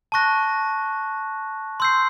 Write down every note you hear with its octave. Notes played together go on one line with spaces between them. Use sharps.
A5 C#6 F#6 A#6
C6 E6 G6 C7